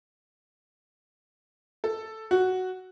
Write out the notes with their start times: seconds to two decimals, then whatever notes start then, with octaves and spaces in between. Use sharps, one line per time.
1.84 A4
2.31 F#4